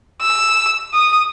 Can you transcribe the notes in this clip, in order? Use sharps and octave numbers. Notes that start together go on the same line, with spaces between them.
E6
D#6